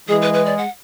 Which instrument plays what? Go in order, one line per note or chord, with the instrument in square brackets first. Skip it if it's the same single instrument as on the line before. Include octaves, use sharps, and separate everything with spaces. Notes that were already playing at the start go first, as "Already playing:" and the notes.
[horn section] E3 G#3 [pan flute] G#4
[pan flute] B4
B4
D5
F#5